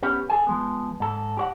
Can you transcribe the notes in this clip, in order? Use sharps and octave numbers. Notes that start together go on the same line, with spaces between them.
B3 C#4 G4
G#4 A4 G#5
F3 G#3 B3
G#2 A4
G4 C#5 F#5